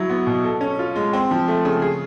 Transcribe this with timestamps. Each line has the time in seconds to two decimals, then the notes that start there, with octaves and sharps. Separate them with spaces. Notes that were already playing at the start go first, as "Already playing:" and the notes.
Already playing: F#3 E4
0.10 B3
0.27 B2
0.44 A4
0.61 C#4
0.79 F4
0.96 G#3
1.13 C4
1.31 F3
1.48 A3
1.65 C#3
1.82 G#4